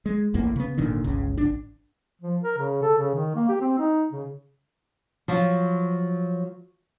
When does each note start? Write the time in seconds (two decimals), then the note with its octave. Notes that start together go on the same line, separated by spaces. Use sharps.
0.06 G#3
0.34 A1 E2 A2 A#3
0.56 C#3 B3
0.78 G#1 A#2 D3 D#3
1.04 G1 C#2 C#3
1.38 G#1 D4
2.22 F3
2.43 A#4
2.58 C#3
2.82 A4
2.98 C#3
3.14 D#3
3.35 A#3
3.49 G4
3.61 C4
3.79 D#4
4.12 C#3
5.28 F3 F#3